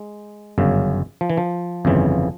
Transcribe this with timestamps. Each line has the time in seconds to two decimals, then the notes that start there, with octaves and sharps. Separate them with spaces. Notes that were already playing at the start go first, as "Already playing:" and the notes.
Already playing: G#3
0.58 G1 F#2 C#3
1.21 F3
1.30 E3
1.37 F3
1.85 G1 F2 C#3 E3